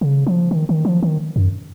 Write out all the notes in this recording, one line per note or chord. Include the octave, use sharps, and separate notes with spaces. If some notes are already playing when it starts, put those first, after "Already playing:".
C#3
F3
D#3
D#3
F3
D#3
F#2